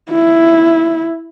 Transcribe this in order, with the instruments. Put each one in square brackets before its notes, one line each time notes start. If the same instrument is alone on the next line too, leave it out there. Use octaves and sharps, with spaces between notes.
[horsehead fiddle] E4